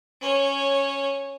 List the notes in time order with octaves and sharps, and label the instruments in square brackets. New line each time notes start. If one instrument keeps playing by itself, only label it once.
[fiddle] C#4 C#5